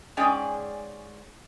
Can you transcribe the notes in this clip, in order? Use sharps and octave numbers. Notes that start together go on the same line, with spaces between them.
G#2 C#4 G#4 D5 G5